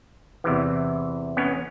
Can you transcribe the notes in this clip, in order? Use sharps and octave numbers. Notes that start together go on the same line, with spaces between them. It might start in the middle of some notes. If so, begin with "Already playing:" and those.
E2 C3 E3
B3 C#4